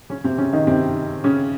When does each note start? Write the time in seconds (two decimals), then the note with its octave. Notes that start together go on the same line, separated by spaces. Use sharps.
0.10 C#3 C#4
0.24 C3 C4
0.38 C#3 C#4
0.53 D#3 D#4
0.67 C3 C4
1.24 C#3 C#4